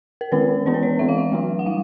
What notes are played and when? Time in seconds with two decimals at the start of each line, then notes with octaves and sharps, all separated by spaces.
0.21 A#4
0.32 D#3 G#3 C#4 B4
0.66 E3 G#3 B3 D4 C5
0.74 B4
0.83 C#5
0.99 E3 G#3 C4 E5
1.09 F5
1.18 E5
1.32 F#3 A3 D4
1.59 F#5
1.66 G3 F5